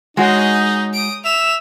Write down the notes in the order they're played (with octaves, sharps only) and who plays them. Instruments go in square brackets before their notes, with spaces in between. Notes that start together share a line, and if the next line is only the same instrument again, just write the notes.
[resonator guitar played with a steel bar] G#3 F#4 C#5 [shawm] D#4 [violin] G#4 D#5
[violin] D#6 D7
[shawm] E5 [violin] E7 F7